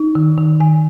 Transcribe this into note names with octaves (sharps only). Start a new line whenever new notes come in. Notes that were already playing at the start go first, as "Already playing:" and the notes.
Already playing: D#4
D#3
D#3
D#3 G#5